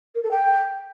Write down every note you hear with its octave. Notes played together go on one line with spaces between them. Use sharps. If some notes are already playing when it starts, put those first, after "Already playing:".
A#4
A4
G5